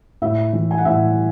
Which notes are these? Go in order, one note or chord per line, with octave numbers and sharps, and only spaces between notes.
A2 E5
E3
G#5
F#5
A2 E5